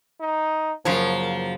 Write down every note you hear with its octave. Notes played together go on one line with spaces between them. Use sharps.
D#4
F#2 C#3 F3 A#3 C#5